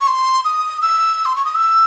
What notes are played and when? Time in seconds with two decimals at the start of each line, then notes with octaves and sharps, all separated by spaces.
0.01 C#6
0.07 C6
0.45 D#6
0.82 E6
1.26 C6
1.36 C#6
1.45 D#6
1.55 E6